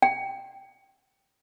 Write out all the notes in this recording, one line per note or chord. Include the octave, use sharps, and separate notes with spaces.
G5